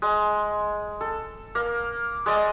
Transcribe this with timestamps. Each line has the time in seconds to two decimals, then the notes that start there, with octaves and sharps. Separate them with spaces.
0.02 G#3
1.01 A4
1.55 A#3
2.26 G#3 D5 D#5